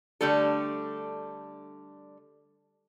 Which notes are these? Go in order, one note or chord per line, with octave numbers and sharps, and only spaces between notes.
D3 G3 A3 D4 A4